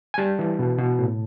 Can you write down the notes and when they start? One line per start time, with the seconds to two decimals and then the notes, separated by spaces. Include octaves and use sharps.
0.14 G#5
0.18 G3 A5
0.39 E3
0.59 B2
0.78 B2
0.99 A2